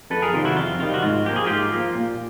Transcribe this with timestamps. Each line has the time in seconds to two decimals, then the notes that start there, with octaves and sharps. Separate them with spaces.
0.10 F2 A4 B4
0.22 G#4 A#4
0.33 C3 D#3 G3 F4
0.45 E4 F#4
0.56 F2 F4
0.79 C3 D#3 G3 F4
0.94 F#4
1.02 G#2 F4
1.26 F3 A#3 G4
1.36 G#4
1.46 G#2 F4 G4
1.72 F3 A#3
1.95 A#2